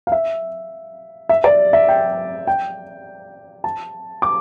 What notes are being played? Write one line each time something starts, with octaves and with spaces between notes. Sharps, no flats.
F5
E5
E5
D5
E5
G5
G5
A5
D6